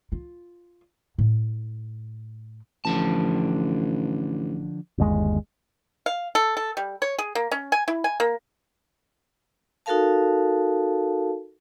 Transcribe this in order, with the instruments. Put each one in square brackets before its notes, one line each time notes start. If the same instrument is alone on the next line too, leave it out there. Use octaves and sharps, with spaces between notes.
[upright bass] F4
A2
[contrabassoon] A1 [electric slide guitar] D3 F3 A5
[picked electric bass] G1 D#2 G#3
[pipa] F5
A4
A4
G3
C#5
G#4
A#3
C#4
G#5
E4
G#5
A#3
[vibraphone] D#4 F#4 A4 A#4 F5 A5